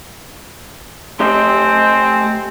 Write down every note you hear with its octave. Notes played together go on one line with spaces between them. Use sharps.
A3 C4 G4 D#5